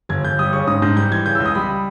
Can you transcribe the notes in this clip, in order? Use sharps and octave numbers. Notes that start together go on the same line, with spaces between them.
G1 G#6
G1 G6
G3 D#6
C#3 C#6
G#2 D#6
G#2 G6
G3 G6
E3 G#6
C#3 G6
E6
C#2
D#6
G3 B5